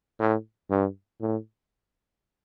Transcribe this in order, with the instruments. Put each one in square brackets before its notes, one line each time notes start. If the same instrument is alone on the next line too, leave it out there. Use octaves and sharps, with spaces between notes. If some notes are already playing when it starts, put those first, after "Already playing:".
[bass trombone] A2
G2
A2